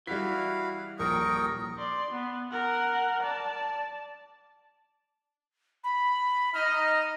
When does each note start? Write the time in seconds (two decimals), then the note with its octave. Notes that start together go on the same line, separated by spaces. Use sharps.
0.07 E3 G3 E4 F#4 F5 B6
0.99 D#1 A#1 A#4 G5 C#6 D#6
1.78 D5 C6
2.11 B3
2.51 A#4 F#5
3.22 D5 A5
5.84 B5
6.54 D#4 D#5 F6